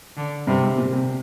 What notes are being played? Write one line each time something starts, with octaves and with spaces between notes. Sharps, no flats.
D3
G2 C3
G#2
A#2
C3